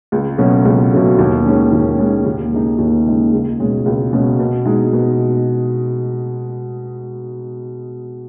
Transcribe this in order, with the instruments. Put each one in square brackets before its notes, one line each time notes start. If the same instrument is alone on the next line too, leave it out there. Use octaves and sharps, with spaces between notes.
[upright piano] C#2
B2 F#3 A3 C#4
C#2
B2 F#3 A3 C#4
D#2
D#3 G#3 C#4
D#2
D#3 G#3 C#4
D#2
C#3 G#3 D#4
D#2
C#3 G#3 D#4
C#2
B2 G#3 C#4
C#2
B2 G#3 C#4
B2
G#3 D#4
B2